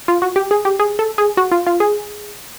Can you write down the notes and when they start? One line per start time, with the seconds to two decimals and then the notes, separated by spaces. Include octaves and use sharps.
0.08 F4
0.22 F#4
0.36 G4
0.51 G#4
0.65 G4
0.79 G#4
0.99 A4
1.18 G#4
1.37 F#4
1.52 F4
1.67 F4
1.80 G#4